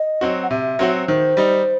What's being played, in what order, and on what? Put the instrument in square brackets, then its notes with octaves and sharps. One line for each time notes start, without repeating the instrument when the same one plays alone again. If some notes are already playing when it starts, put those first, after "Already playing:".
Already playing: [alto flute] D#5
[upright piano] F#3 C4 F#4
[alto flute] F#5
[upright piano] C3 [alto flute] E5
[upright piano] F#3 C4 F#4
[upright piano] D#3 [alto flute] C5
[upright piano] G3 D#4